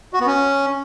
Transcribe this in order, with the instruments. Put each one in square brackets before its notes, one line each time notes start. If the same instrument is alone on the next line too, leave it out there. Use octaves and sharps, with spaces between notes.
[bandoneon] F#4
B3
C#4